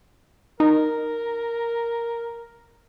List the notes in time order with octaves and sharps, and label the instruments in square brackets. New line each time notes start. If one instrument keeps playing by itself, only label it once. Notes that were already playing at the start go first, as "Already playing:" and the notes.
[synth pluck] D#4 [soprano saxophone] A#4